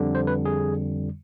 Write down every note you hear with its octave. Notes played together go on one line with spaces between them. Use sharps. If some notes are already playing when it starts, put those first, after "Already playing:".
Already playing: F2 D3 G3
C5
B4
G#4